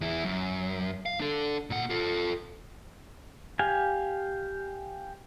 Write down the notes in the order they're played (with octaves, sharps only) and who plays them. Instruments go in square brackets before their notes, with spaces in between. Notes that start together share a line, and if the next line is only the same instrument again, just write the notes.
[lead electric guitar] E2 E4
F#2
F5
D4 A4
A#2 F#5
F4 A4
[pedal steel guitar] G4 F5 G#5